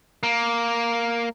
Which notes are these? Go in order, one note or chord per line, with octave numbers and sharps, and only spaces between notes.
A#3